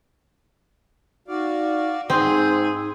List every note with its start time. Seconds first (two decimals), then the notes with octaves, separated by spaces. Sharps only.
1.28 D#4 F#4 D5 F5
2.10 G#2 C4 D#4 G#4